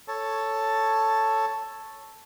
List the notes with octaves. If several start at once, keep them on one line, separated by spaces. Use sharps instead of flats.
A4 C#5 A5